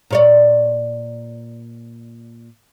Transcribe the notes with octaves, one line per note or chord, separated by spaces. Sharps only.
A#2 C#5 D5